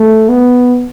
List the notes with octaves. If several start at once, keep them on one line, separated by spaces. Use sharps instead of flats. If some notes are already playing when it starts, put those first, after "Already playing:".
Already playing: A3
B3